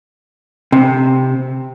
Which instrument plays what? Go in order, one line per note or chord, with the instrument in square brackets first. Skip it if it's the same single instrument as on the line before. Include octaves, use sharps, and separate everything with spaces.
[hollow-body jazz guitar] C3